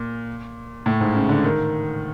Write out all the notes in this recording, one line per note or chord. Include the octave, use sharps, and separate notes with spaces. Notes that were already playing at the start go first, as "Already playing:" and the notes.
Already playing: A#2
A2
G#2
C#3
D3
D#3